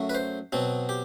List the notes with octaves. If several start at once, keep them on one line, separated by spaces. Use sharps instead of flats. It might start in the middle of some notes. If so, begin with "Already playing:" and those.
Already playing: F#2 F#3 A3
B4
C5
B2 F#3 C4
G4